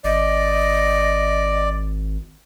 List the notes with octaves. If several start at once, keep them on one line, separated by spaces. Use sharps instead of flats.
G#1 D5 D#5